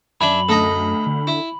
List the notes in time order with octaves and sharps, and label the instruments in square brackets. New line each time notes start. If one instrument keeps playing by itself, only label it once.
[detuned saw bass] F#2 [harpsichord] D4 E5 G#5 [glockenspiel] B5 F#7
[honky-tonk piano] D2 [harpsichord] A4 D#5 A#5
[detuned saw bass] D3
[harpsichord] E4